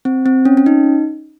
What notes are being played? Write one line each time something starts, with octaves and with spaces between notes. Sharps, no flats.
C4
C4
C#4
C#4
D#4